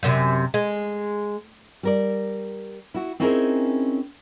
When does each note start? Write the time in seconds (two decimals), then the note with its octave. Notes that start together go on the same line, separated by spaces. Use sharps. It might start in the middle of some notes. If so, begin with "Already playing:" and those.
0.03 F#2 C3
0.54 G#3
1.83 G3 A#4 D5
2.94 E4 F#4
3.20 C4 C#4 D#4 E4 G#4 A#4